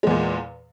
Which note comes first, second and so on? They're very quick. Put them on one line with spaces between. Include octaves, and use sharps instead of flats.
G#3 E2 A#2